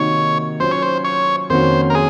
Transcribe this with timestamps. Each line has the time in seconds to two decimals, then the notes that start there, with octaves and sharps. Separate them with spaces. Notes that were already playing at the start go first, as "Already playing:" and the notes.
Already playing: C3 D#3 A#3 D#4 F#4 C#5
0.60 F#3 C#4 F4 C5
0.71 C#5
0.82 C5
1.04 C#5
1.50 F2 D#3 A#3 C#4 F#4 C5
1.90 A#4
1.95 G#4